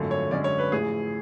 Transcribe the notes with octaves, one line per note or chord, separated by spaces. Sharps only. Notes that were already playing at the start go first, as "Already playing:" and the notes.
Already playing: G#1 F#2 D3 F3 A3
C#5
F#2 D3 G#3 C#4 D5
C#5
B4
A1 A2 F3 G#4